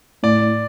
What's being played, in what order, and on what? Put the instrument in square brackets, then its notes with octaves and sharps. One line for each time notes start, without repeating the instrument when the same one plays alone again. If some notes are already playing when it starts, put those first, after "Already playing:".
[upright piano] A2 [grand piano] D5